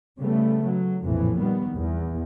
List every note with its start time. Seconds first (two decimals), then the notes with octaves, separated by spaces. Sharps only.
0.20 C#3 G3 A3 B3
0.65 F#3
1.05 A#1 F2 A2 E3
1.39 D#3 G3 B3
1.74 E2